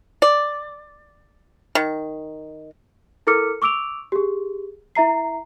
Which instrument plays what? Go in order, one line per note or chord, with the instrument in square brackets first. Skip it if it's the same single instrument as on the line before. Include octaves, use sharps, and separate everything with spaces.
[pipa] D5
D#3
[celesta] E4 A4 A#4 D6 F6 C#7
C#6 D6 E6 D7 F7
G4 G#4
E4 E5 A#5 C7